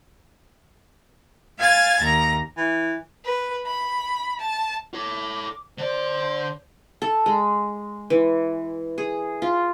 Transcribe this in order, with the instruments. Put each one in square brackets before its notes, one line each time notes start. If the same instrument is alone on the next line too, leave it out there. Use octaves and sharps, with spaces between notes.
[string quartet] F5 G#5 G#6 A6
D#2 A#5
[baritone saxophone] E3
[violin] B4
B5
A5
[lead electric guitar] A4 C#5 [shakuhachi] D6
[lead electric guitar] D3 D5 [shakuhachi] C5
[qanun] A4
G#3
E3
G#4
F4